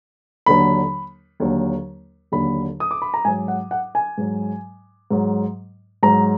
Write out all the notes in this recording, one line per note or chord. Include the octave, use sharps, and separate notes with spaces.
D#2 D3 F#3 B5
D#2 D3 F#3
D#2 D3 F#3 B5
D#6
D6
B5
A#5
G#2 F#3 G#5
F#5
F#5
G#5
G#2 F#3
G#2 F#3
G#2 F#3 A#5